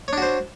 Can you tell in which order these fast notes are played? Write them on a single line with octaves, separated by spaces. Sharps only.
C#5 D4 F#4 C5